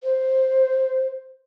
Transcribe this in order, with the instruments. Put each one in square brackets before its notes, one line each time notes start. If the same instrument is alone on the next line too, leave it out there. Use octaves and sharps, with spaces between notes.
[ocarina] C5